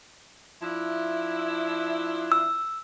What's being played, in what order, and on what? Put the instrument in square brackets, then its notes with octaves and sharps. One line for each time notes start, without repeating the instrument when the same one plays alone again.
[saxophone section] F3 D4 E4
[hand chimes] E6